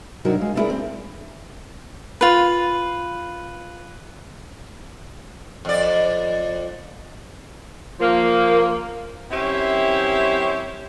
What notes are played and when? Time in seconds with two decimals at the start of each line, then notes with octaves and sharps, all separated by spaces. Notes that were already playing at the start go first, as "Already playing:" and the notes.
0.25 C3 F#3 D4 D#4 F#4 A#4
0.38 G#3 F5
0.55 A3 B3 D4 E4 G#4 A#4
0.70 C4
2.21 F4 B4
5.65 F2 D5
8.00 F3 A#3
9.31 F#2 C4 C#4 E4 G4 E5